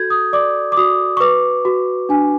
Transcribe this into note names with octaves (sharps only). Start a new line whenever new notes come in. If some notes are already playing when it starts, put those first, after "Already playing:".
Already playing: F#4 A4 G6 G#6
D#6
D5 D6
D6
F#4 D#6
C#6
B4 D6
F#4
D4 G#5